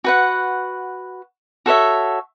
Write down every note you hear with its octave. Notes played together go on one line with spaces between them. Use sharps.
F#4 B4 F#5
F#4 A4 C#5 E5